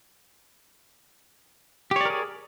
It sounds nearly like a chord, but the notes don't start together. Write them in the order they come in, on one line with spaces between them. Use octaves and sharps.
G4 C#5 D5 A#4 G#4